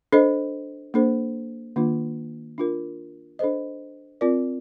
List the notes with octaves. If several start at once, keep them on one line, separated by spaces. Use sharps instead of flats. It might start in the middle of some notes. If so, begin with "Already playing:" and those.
D4 A4 C5 D#5
A#3 D4 A4 C5
D#3 A#3 D4 F4
D4 F4 A#4
D4 A4 C5 D#5
C4 F4 A#4 D5